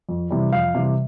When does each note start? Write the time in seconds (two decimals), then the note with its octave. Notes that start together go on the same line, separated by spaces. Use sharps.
0.09 F2
0.30 C3 E3 G3
0.52 F2 F5
0.75 C3 E3 G3